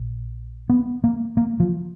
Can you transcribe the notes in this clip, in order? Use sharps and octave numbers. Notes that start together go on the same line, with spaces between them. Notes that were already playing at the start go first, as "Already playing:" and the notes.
Already playing: A#1
B3
A#3
A#3
F3